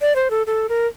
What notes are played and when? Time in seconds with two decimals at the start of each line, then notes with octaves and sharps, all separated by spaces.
0.01 D5
0.16 C5
0.30 A4
0.47 A4
0.69 A#4